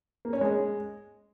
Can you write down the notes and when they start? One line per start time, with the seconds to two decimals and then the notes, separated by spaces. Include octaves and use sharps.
0.25 A#3
0.33 C#4
0.41 G#3